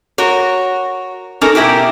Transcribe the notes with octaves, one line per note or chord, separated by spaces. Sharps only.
F#4 A#4 C#5
C#4 D#4 A4 A#4
B2 E4 G4 A#4